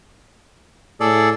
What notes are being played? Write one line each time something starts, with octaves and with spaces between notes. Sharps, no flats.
A2 G#4 A4 D5